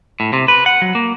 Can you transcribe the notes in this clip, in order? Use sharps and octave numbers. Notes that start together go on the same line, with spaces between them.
A2
C3
B4
F#5
F#3
A#3